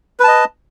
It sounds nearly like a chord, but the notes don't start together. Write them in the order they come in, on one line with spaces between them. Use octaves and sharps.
B4 A5 D#5